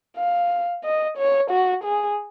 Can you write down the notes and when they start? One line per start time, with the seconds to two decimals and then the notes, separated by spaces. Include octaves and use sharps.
0.17 F5
0.84 D#5
1.17 C#5
1.51 F#4
1.84 G#4